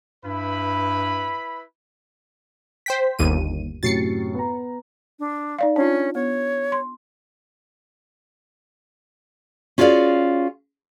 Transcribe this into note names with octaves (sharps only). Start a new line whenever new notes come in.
G2 E4 B4 B5
C5 G5 B6
G1 D#2 D#7
F#2 A2 C3 A6 C7 C#7
B3 A#5
D4
D#4 D5 F5
C#4 D4 F4
B3 C#5
C6
C#4 F4 F#4 G#4 D5 F5